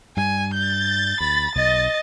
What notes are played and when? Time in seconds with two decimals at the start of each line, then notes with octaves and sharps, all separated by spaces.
0.17 G2 G3 G#5
0.54 G6 A6
1.20 D2 B5
1.55 B1 D#5